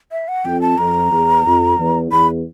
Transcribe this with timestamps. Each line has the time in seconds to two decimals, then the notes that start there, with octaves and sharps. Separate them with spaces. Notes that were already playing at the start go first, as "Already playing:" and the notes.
0.12 E5
0.28 F#5
0.45 F2 G5
0.62 A5
0.78 F2 A#5
1.12 E2
1.46 F2
1.79 E2
2.12 E2 B5